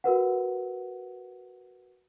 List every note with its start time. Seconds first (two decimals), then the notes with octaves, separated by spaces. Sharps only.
0.04 F#4 A#4 B4 F#5